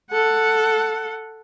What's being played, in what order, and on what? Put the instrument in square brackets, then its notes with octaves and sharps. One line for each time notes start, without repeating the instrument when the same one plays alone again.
[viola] A4 F#5